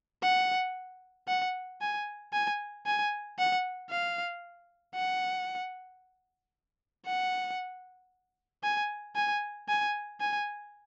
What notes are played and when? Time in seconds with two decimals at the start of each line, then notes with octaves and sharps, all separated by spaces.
0.23 F#5
1.28 F#5
1.81 G#5
2.33 G#5
2.86 G#5
3.39 F#5
3.90 F5
4.95 F#5
7.06 F#5
8.63 G#5
9.16 G#5
9.69 G#5
10.20 G#5